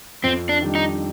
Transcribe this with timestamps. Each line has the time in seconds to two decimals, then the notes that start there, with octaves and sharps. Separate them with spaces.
0.23 F2 C4
0.49 D4
0.62 D#3 G3 D4
0.75 D#4